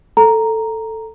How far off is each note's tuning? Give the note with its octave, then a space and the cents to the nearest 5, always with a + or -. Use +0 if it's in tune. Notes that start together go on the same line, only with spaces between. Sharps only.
A4 +5 A#5 +0